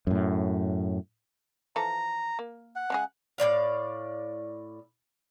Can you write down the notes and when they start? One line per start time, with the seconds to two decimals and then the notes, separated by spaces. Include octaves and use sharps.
0.07 F#2 A2
1.76 E3 F3 A4 A#5
2.39 A#3
2.76 F#5
2.90 C#3 G#3 G#4
3.38 A2 G3 D5 F5